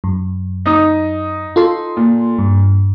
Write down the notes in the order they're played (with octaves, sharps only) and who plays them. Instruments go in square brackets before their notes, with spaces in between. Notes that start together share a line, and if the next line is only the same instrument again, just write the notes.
[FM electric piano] F#2
[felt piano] D#4 D#6
[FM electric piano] F4 A4 C6
[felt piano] A#2
[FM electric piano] G2